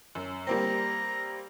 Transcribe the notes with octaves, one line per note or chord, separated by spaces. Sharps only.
F#2
G3 A#3 C4 A#5